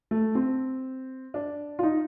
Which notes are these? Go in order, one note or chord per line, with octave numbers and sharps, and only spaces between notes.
A3
C4
D4
F4
D#4